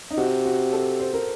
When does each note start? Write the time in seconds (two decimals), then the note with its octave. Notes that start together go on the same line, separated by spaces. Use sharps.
0.11 D#4
0.17 C3 F#4
0.45 F#4
0.73 A4
1.00 C5
1.14 A#4